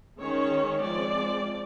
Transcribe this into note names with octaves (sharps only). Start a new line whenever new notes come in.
D#3 G#3 C#4 C#5
F3 G#3 C4 D5